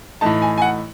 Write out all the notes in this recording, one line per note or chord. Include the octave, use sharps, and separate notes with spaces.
A2 E3 A3 D#4 A5
G#5
G#5
F#5